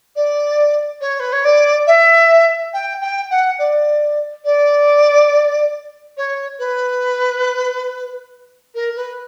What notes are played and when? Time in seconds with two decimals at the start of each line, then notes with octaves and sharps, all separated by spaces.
0.15 D5
1.01 C#5
1.19 B4
1.32 C#5
1.44 D5
1.86 E5
2.73 G5
3.01 G5
3.30 F#5
3.58 D5
4.44 D5
6.17 C#5
6.59 B4
8.74 A#4
8.96 B4